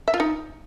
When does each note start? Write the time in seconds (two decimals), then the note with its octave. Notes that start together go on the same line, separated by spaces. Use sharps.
0.08 E5
0.14 F4
0.20 D#4